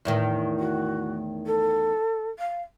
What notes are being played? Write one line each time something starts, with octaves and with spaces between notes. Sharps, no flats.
E2 A2 D#3
F#4
A4
F5